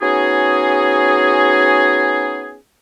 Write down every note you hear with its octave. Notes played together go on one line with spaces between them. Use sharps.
B3 C#4 D#4 F#4 G#4